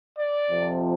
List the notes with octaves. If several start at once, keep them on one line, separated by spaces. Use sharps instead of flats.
D5
F2 C3 F3